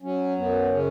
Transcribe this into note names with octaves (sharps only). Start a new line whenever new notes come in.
F#3 C#4
F#2 B3
C#3 C#4